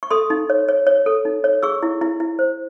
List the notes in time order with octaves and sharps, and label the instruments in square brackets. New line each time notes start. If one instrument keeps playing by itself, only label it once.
[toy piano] C#6
A4 C6 D#6
D#4
C#5
C#5
C#5
A4
D#4
C#5
G#4 C#6 E6
E4
E4
E4
C5